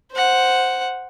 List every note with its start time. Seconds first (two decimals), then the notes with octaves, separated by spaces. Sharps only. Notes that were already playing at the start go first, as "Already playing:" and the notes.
0.12 C5 F#5